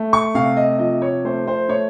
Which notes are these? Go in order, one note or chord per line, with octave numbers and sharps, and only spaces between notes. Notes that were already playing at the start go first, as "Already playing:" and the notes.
Already playing: A3
C#6
C3 F5
D#5
F3 D#5
C#5
A3 C5
C5
A3 C#5